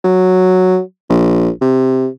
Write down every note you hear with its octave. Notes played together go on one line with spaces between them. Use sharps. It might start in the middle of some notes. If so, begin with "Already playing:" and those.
F#3
A#1
C3